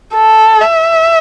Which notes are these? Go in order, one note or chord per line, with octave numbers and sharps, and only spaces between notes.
A4
E5